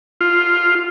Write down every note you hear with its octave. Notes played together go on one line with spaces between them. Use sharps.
F4